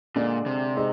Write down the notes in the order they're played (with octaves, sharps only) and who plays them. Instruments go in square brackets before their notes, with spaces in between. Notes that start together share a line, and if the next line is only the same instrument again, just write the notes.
[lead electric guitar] A#2 [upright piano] D3 G#3 D4 G#4 D5
[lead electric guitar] C3
[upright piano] G#3 C4 D#4